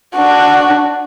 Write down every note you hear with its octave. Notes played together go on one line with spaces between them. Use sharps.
D4 F#4